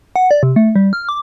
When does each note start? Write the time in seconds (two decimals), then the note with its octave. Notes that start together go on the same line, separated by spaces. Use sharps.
0.16 F#5
0.31 D5
0.43 C3
0.56 A3
0.75 G3
0.93 F6
1.09 D6